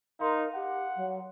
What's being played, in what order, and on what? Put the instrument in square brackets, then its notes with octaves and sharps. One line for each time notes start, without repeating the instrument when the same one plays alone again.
[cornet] D#4 [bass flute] A#4 [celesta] F5 C6
[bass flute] G4 [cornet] F#5
[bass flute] F#3